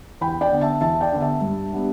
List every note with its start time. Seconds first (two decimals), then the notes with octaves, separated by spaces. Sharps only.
0.21 E2 G5 B5
0.41 D5 G5
0.52 D3 B3 D4
0.61 E5 A5
0.81 E2 E5 A5
1.01 D5 G5
1.12 D3 B3 D4
1.21 E5 A5
1.41 G2
1.72 G3 B3 D4